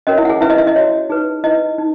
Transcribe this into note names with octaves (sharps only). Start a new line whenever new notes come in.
C#4 F#4 A#4 C#5 D#5
E4 E5
F#5
G#4 G#5
C#4 E4 B4 E5
D#5
E4 E5
D#5
F#4 C#5
D#4 G#4 B4
E4 B4 D#5
D#4